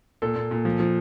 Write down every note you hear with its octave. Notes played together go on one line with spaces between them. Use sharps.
A#2 A4
A#2
A#2
F3
F3